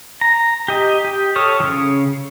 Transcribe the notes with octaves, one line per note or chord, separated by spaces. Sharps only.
A#5
G4 D#5
G4
A4 C#5 D#6 F6
C#3 F3